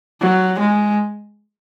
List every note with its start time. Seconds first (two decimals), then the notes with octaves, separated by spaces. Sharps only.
0.21 F#3
0.59 G#3